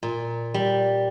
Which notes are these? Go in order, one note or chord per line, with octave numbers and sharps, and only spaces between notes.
A#2
G3